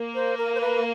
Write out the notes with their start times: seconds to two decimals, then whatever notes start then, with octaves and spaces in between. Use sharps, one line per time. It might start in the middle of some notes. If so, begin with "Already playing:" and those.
Already playing: A#3
0.15 C5
0.37 A#4
0.55 C5
0.60 B4